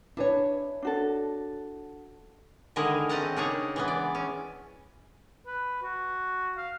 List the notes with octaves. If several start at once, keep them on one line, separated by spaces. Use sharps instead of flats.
D4 E4 B4 C#5 G#5
D4 F#4 A4
D3 D#3 G#3 E4 A#4 D#5
C4 C#4 D#5 F#5 A5 A#5
C#3 A#3 D4 D#4 C#5 F#5
E3 G#3 B3
D5
C#4
B4
F#4
F5